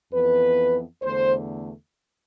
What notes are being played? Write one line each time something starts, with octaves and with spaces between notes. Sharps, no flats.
F2 E3 B3 B4
E2 D3 A3 C5